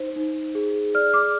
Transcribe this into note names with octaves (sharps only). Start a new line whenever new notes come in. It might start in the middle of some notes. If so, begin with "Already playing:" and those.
Already playing: D#4 C5
D#4
G#4
D5 F6
D6